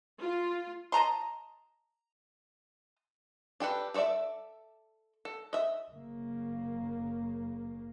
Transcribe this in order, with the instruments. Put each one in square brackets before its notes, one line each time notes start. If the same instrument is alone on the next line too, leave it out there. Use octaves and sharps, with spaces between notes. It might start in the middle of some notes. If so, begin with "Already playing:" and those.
[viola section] F4
[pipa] D#5 A5 A#5 C6
[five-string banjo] D4 G4 A4 B4
G#4 A4 C#5 D5 E5
A4
D#5 E5
[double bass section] F#1 C#3 A#3